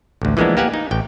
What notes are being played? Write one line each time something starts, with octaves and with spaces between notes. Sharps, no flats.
A1 D2
E3 F3 G#3 A#3 B3 D4
A#3 B3 G4 F5 F#5 G#5
D#4
A1 G5